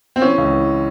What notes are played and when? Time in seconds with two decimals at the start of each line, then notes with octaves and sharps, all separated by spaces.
0.16 C4
0.22 E3 C#4
0.38 C#2
0.53 E3